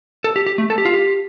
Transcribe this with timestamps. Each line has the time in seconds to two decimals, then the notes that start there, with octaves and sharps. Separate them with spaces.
0.24 A4
0.36 G4
0.46 G4
0.58 A3
0.70 A4
0.78 G4
0.85 F4
0.93 G4